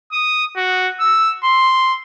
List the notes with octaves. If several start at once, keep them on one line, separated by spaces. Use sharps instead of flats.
D#6
F#4
E6
C6